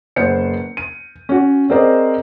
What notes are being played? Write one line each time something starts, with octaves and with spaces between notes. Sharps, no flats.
F#1 B3 C5 G6 C#7
D#7
C#4 F#4
C4 G#4 A#4 C5 D5 D#5